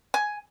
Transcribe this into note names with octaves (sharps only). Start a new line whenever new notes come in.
G#5